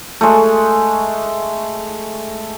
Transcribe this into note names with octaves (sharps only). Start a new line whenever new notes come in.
G#3 A3